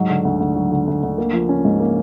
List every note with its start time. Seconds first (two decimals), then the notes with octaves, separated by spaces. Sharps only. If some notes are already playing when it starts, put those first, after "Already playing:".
Already playing: G#2 F#3
0.09 D3
0.25 D2
0.40 D2
0.55 F#3
0.71 D3
0.87 D2
1.03 D2
1.18 A#3
1.33 F3
1.49 C#4
1.65 G#2
1.80 A#3